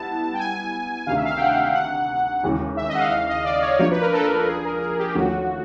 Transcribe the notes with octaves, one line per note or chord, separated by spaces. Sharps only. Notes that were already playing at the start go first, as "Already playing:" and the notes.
Already playing: G3 B3 E4 A5
G5
G#5
D2 C3 D#3 F5
E5
F5
G5
F#5
G5
F#5
D#2 C#3 E3 G#3
E5
D#5
F#5
F5
F5
D#5
D5
C#5
F3 A#3 D4 C#5
B4
A#4
A4
A#4
A4
G#4
A#4
G#4
G4
D#2 D3 F3 A3 C#4 F#4